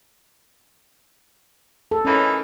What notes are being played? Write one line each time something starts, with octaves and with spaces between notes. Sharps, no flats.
A4
E3 A#3 C#4 D#4